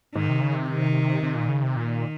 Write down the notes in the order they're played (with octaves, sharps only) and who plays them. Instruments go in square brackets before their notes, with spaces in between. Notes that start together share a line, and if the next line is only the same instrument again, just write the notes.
[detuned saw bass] G#2 [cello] D#3
[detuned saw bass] C3
C#3
C3
[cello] D#3
[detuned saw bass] C3
A#2
C#3
C3
[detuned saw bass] A#2 [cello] D#3